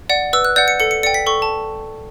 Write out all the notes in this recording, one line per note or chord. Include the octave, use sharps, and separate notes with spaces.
D5 F#5
B4 E6
F#6
D5 F#5 G6
C#7
A4 C#7
C#7
D5 G5 C#7
B6
A4 C#6
A5